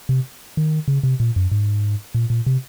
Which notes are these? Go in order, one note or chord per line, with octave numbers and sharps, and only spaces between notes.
C3
D#3
C#3
C3
A#2
F#2
G#2
A#2
A#2
C3